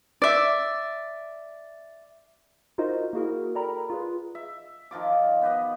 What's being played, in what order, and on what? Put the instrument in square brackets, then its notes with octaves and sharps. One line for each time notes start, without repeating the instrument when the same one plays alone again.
[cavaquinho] D5 E5
[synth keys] D#4 F4 F#4 A#4 C5 D#5
A#3 E4 F#4 G#4 A#4
A4 A#4 D5 G5 A#5 B5
F4 G#4 B4
[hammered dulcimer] E5
D#3 F3 F4 D6
B3 G4 B4 D#5